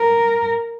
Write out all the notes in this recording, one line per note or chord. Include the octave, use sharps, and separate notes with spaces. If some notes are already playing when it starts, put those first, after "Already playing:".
Already playing: A#4